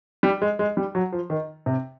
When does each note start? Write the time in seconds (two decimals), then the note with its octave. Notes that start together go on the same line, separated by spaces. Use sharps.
0.23 G3
0.42 G#3
0.59 G#3
0.77 G3
0.95 F#3
1.13 F3
1.30 D#3
1.66 C3